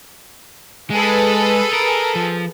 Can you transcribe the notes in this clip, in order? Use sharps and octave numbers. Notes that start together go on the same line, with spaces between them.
G#3 G#4 A4 B4
A#4
F3